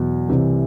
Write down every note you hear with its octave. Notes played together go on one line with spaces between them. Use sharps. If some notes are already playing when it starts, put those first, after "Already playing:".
Already playing: E2 B2 F#3
C2 C3 E3